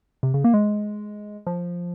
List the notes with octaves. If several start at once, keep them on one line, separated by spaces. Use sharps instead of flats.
C3
C#3
A#3
G#3
F3